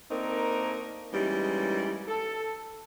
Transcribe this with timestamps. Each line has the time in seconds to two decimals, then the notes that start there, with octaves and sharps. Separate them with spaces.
0.11 A3 A#3 C4 D4 D#4 A#4
1.13 E3 G3 G#3 A#3 C#4 D#4
2.08 A4